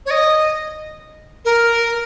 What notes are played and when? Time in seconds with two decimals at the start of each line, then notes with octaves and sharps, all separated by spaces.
0.05 C#5
0.10 D#5
1.44 A#4